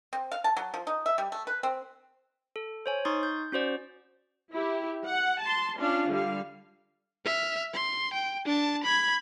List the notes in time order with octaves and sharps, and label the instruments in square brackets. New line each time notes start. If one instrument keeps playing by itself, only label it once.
[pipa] C4
F5
A5
F#3
F3
D#4
E5
G3
A3
B4
C4
[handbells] A4
C5 C#5 G#5
D#4 C6 C#6 D#6 A6
G6
C#4 F#4 C5 D5
[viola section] E4 G4
F#5
A5 C6
C#4 D4 F4 F5
D3 G3 F5
[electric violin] E5 F6
C6
G5
D4 A5
B5 G#6